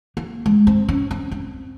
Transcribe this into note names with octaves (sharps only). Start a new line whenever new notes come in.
A#3
G#3
C4
C#4
C4
C4